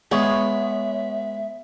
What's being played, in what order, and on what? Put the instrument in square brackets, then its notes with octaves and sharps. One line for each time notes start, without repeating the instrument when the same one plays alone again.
[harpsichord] G#3 [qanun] B3 [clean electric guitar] C#5 [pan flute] E5